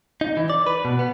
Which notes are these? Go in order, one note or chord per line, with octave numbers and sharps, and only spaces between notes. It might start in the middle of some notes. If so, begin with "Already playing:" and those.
D#4
E3
D5
B4
B2
B3